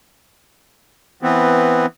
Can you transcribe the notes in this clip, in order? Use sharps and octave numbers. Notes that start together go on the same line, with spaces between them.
E3 B3 C4